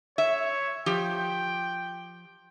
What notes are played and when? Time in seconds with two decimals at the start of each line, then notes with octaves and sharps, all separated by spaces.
0.18 C#5 E5
0.86 F3 G4 G5